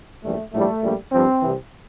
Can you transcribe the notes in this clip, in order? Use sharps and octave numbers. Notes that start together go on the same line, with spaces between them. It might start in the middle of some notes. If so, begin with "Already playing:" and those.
A#1 A2 E3 G3 A3
A#1 A2 E3 G3 A3
A#1 A#2 G3
G2 F3 C4
C2 C3 E3